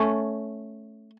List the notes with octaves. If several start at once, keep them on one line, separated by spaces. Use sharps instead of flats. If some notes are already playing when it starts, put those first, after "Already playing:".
Already playing: A3 C#4